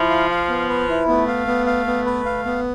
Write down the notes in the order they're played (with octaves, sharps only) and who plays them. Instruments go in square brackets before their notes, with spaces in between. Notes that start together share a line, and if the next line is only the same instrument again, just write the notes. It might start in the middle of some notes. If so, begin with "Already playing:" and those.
Already playing: [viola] F3 [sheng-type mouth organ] E4
[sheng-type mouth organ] F5
F5
B3
B4
E4
[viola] A3 [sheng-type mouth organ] B3
[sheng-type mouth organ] F5
B3
F5
B3
B4
F5
B3